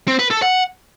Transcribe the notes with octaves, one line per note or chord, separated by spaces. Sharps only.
C4
B4
A4
F#5